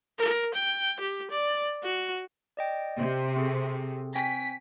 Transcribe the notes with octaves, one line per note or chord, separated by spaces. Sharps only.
A#4
G5
G4
D5
F#4
D5 D#5 G5
C3
C4 G#4 A4
C4 G5 G#5 B6